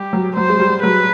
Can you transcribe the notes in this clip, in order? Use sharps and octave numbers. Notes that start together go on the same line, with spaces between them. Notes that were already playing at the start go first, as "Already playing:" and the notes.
Already playing: G3 G4
F#3
F#3 C5
G#3
G3
F#3 B4